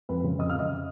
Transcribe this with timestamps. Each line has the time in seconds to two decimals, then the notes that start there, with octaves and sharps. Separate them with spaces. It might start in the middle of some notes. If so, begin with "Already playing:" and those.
0.09 F2 B4 B5
0.24 C#3
0.39 F2 D#5 D#6
0.50 F5 F6
0.55 C#3 D#5 D#6